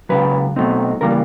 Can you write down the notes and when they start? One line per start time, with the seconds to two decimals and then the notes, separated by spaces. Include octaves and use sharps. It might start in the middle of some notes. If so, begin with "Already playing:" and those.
0.09 C#2 C#3 F#3 B4
0.56 B2 F#3 A3 C4 D#4
1.01 C#3 E3 G3 A#3 A#4